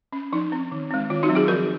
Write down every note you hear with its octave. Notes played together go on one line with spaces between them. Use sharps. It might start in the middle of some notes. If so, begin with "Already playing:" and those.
C#4
F3 D#4
C4
D#3
G#3 C4
D#3 F4
D#4 F#4
F#3 C4
F4 G#4
F3 F#4 A#4